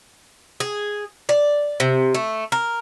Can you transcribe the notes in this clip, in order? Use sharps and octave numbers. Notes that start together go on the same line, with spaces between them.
G#4
D5
C3
A3
A#4